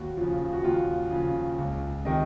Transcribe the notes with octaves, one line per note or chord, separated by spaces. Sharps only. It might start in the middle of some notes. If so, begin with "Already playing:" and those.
Already playing: D#2 F#4
C#3 F3
F#4
D#2 F4
C#3 F3
C#2
C3 D#3 D#5